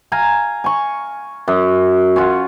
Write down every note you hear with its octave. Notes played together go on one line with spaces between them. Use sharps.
F5 G#5 A#5
G#5 C#6
F#2
C#4 F4 F#4